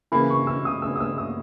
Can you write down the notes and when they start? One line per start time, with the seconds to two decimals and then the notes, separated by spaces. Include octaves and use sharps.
0.12 C#3 E3 A#3 B5
0.30 C#6
0.47 E6
0.65 D#6
0.82 E6
0.96 D#6
1.00 E6
1.18 D#6